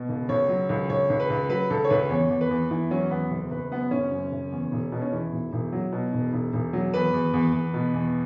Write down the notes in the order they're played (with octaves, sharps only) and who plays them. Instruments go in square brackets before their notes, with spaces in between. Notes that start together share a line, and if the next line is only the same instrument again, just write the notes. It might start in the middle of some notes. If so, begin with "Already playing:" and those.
Already playing: [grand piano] B2
C#2
C#2 C#5
F#3
C#2
C#2 C#5
C#2
B4
C#2
F#3 B4
C#2 A4
C#5
C#2 B4
E2 C#5
E2
B4
E2
E2 E4
F#3 C#4
E2 B3
F#1
F#1 B4
F#2 B3
F#1 C#4
F#2
F#1
E2
E1
B2
C#4
E2 E4
E1
E1
F#3
B2
E1
E1
E1
F#3
E2 B4
E2
E2
E2
B2
E2